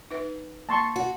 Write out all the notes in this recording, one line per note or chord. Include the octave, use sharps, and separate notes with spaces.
D#4 B4 E5
A#3 A5 C6 C#6
F#4